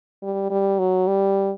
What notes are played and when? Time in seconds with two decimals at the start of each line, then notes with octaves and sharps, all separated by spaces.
0.23 G3
0.50 G3
0.79 F#3
1.08 G3